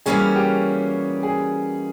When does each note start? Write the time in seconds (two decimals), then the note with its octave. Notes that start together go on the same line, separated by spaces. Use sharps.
0.06 E3 G3 A#3 C#4 F#4 G#4
0.36 G4
1.23 G#4